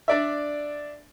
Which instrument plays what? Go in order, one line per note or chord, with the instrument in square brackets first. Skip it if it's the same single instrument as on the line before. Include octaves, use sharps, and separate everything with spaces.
[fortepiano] D4 D5 E5